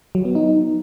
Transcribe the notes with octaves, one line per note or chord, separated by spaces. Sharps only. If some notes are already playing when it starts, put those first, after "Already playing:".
F#3
B3
D#4